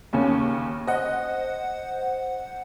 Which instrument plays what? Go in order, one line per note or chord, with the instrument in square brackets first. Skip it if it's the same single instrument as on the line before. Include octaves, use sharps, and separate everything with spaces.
[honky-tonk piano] D#2 C#3 C#4
[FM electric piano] C5 F#5 [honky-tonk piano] D#5